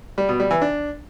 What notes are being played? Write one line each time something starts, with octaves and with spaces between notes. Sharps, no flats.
G3
B2
G3
E3
D4